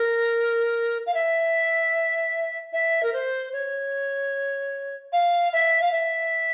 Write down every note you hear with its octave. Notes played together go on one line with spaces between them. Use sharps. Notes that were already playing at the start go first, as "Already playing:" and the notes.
Already playing: A#4
F5
E5
E5
A#4
C5
C#5
F5
E5
F5
E5